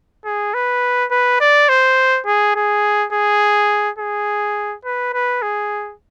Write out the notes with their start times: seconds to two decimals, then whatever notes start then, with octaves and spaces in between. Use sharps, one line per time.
0.25 G#4
0.54 B4
1.11 B4
1.40 D5
1.69 C5
2.26 G#4
2.55 G#4
3.12 G#4
3.98 G#4
4.84 B4
5.14 B4
5.42 G#4